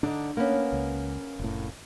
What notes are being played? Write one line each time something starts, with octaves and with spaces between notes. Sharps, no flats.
D3 D4 D#4
A#3 B3 C#4
C#2
F1 A2